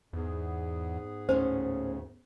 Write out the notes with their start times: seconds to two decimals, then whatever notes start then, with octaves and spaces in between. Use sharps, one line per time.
0.13 E2 G#2 B3 G#4
1.29 D2 A2 A#3 C#4 C5